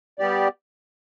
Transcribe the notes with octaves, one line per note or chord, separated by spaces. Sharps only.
G3 B3 G4 D5